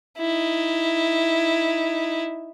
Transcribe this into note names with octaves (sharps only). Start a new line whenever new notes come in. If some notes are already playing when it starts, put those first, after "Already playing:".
D#4 E4